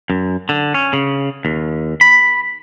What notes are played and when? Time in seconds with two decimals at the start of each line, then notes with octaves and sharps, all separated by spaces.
0.10 F#2
0.49 D3
0.74 C#4
0.93 C#3
1.45 D#2
2.01 B5